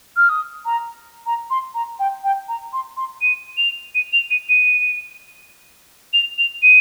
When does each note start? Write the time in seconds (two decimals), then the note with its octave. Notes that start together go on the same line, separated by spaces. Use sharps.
0.16 F6
0.29 D#6
0.65 A#5
1.26 A#5
1.50 C6
1.74 A#5
1.99 G5
2.23 G5
2.48 A#5
2.72 C6
2.96 C6
3.21 D#7
3.57 F7
3.94 D#7
4.12 F7
4.30 D#7
4.49 D#7
6.13 F7
6.38 F7
6.62 D#7